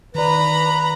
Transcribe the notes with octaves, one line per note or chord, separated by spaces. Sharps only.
D#3 B4 D5 A#5 B5